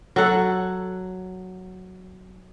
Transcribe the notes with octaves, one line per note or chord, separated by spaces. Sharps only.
F#3 A4 F#5